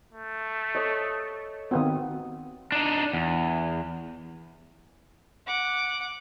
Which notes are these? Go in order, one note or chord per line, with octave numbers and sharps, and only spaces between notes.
A3
A4 C#5 D#5
D#3 B3 C4 F#4 D#6
D4 D#4
E2
F#5 D6